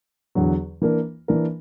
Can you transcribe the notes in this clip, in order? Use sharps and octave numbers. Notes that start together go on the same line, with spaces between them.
E2 D3 F#3
E3 A#3 D4 A#4
E3 A#3 D4 A#4